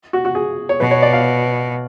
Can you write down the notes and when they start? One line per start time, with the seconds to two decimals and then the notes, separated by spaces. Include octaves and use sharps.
0.13 F#4
0.25 F#4
0.35 G#4
0.69 C#5
0.80 B2 B4
0.91 C#5
1.02 D5
1.13 F5